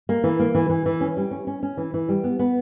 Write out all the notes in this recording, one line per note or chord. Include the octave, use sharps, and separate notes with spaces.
A#3
E3
A#3
E3
E3
E3
C#4
G3
C#4
C#4
C#4
E3
E3
G3
B3
B3